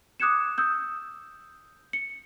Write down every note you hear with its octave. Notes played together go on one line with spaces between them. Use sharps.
D6 D#6 F#6 G#6 C#7 E7
D#6 E6 G6
C#7